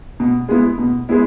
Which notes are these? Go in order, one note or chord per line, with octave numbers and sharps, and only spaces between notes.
B2
G#3 B3 E4
B2
G#3 B3 E4